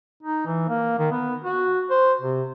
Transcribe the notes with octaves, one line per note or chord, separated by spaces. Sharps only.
D#4
E3
A#3
D#3
B3
F#4
C5
C3